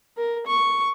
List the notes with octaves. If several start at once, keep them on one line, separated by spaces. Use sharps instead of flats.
A#4
C#6